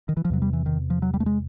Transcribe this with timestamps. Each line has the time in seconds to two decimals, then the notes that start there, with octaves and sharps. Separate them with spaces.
0.09 D#3
0.17 E3
0.25 F3
0.30 E2 C3 F#3
0.42 G3
0.53 E3
0.66 D#3
0.90 F3
1.02 F#3
1.14 G3
1.20 A3
1.26 G#3